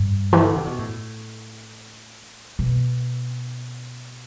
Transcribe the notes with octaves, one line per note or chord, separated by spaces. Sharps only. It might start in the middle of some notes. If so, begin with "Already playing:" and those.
Already playing: G2
E3
D3
C3
B2
A2
B2